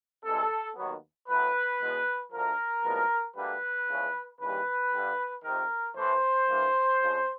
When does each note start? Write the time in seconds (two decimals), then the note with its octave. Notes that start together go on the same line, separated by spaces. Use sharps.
0.24 C2 C3 E3 G#3 A4
0.77 D#2 D#3 F#3 B3
1.29 A2 F#3 B3 B4
1.81 E2 B2 G#3 B3
2.32 D2 D3 F3 A#4
2.85 C2 A#2 F3 G#3 B3
3.36 D2 D3 G3 A#3 B4
3.89 E2 C#3 F3
4.41 D#2 C#3 E3 G3 B4
4.93 G2 D3 G3
5.44 F2 C3 D#3 A#4
5.97 A2 E3 A3 C5
6.49 G2 E3 G3 A#3
7.01 F2 C#3 F3